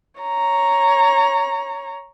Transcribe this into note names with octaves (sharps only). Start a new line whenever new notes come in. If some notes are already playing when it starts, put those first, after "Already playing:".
C#5 A#5